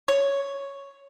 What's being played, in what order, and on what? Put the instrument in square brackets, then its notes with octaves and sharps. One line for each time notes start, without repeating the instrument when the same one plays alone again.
[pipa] C#5